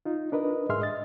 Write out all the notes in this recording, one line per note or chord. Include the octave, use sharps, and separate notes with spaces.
D#4 F4
D4 A#4 B4 D#5
G#2 G#4 E5 C6 F6
D#5 A6